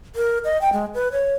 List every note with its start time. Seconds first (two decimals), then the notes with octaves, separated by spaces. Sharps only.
0.16 A#4
0.44 D#5
0.61 G5
0.73 G#3
0.94 B4
1.12 C#5